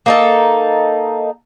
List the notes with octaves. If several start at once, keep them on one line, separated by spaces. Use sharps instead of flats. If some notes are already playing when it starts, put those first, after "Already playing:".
A#3 D#4 A4